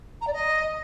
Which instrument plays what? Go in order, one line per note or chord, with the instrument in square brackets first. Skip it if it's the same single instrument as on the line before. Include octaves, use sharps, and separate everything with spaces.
[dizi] A#5
D5
D#5